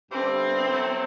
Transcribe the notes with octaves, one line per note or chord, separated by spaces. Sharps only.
G2 D3 G3 B3 C4 E4
F#3 B3 E4 A4 C5